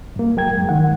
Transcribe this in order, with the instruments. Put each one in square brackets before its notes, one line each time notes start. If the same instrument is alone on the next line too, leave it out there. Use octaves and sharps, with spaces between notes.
[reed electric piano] G2 A#3
F#3 A#4 G5 G#6
F#2 G#3
D#3 F#5